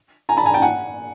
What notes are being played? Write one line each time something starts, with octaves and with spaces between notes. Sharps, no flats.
G#5 A#5
A5 B5
G#5 A#5
G5 A5
F#5 G#5